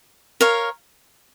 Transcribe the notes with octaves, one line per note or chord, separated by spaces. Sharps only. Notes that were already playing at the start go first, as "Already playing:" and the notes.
A#4 C#5 F5